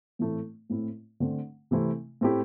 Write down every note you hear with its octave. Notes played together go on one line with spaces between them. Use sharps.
A2 E3 A3 C4 E4
A2 A3 C4 E4
D3 A3 C4
C3 E3 A3 C4 E4
A2 A3 C4 E4 G4